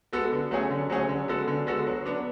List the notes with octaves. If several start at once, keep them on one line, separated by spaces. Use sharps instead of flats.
G#3 B3 F#4 A4
D3
F#3 A3 C#4 G#4
D3
F#3 A3 C#4 G#4
D3
G#3 B3 F#4 A4
D3
G#3 B3 F#4 A4
F#3
B3 D4